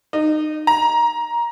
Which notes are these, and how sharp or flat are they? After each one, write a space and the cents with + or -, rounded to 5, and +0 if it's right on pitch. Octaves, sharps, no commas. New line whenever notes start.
D#4 -25
A#5 +15